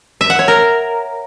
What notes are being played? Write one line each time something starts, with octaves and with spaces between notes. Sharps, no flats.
E5
F#5
C#5
A#4